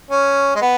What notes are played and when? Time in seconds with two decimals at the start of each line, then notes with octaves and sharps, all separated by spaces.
0.10 C#4
0.55 G#3
0.61 B3